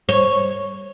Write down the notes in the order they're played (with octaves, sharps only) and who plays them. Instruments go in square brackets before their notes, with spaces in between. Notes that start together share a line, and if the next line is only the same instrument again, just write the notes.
[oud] C#5